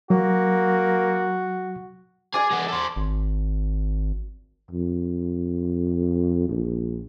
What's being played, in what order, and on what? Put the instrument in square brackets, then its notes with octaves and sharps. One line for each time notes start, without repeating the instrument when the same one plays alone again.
[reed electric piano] F#3 [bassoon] A#3 [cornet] F#4
[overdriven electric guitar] G#4 [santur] D5 G#5
[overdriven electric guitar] G#3 B3
A4 C5
[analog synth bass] G#1
[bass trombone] F2
A#1